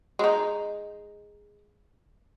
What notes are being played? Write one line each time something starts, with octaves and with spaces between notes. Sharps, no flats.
G#3 D#4